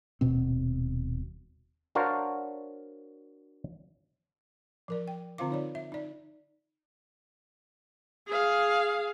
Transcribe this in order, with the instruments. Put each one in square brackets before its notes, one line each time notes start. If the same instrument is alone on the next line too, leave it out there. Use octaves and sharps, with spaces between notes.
[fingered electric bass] D#1 B2 C4
[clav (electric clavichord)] D4 F#4 A#4 C5 C#5 F5
[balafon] F3 A#4 D5
G5
D3 C4 F4 C5 F5 D6
D#4 C#5 D5
E5
D#4 D5
[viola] G#4 F5